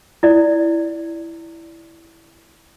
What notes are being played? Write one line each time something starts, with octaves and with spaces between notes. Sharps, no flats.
E4 D5